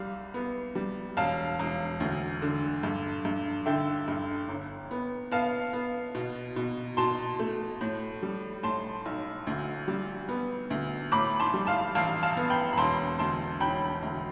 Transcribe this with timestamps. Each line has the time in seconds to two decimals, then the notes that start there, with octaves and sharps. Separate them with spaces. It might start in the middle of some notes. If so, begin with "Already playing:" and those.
Already playing: C2 G3 F5
0.34 B3
0.75 G3
1.17 E1 F5 A5
1.59 E1
2.00 D2
2.42 D3
2.83 G2
3.25 G2
3.66 D3 E5 G5
4.08 G2
4.48 G1
4.91 B3
5.31 B3 F5 A5
5.73 B3
6.15 B2
6.56 B2
6.97 B2 A5 C6
7.39 A3
7.81 A2
8.23 G3
8.63 A2 A5 C6
9.05 B1
9.47 D2
9.88 G3
10.29 B3
10.70 D2
11.12 A2 B5 D6
11.40 A5 C6
11.54 G3
11.67 F5 A5
11.95 A1 F5 A5
12.23 F5 A5
12.37 B3
12.50 G5 B5
12.73 B5
12.77 E1 A5 C6
13.19 D2 A5 C6
13.60 E1 G5 B5
14.03 D2